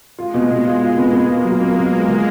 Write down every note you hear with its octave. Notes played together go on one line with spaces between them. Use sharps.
G#3 F4
B2
B2
G#3 F4
F4
B3
A#3 B3
F4
F#3
G#3 B3
B3
F4
D3